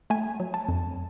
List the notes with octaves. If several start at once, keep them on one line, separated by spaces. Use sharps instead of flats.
A3 G#5
F#3
A5
F2